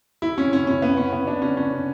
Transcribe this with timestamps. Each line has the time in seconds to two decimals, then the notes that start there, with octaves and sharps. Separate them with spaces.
0.22 E4
0.38 C#4
0.53 C#4
0.67 C#4
0.82 B3
0.97 C#4
1.13 B3
1.27 D4
1.42 C#4
1.57 C#4